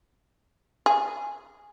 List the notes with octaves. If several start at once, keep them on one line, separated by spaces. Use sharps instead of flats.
G#4